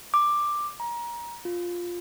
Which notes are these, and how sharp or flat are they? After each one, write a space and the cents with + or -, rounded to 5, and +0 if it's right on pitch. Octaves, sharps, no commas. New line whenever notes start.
D6 +10
A#5 +25
F4 +5